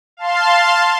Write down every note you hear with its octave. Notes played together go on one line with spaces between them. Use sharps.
F5 A5 C6